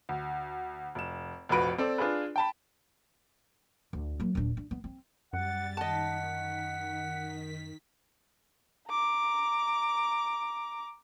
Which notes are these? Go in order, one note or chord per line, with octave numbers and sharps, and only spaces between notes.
D2
F1 E7
F1 A#1 F#4 B4 D7
C4 A4 D5
D4 F4 G#4 B4
G5 A5 B5
D2
F#3 A#3
D#1 D4
D4
B3
C4
F#2 G3 F#5 A6
D#3 D#5 F#5 A5 B6
A#5 D6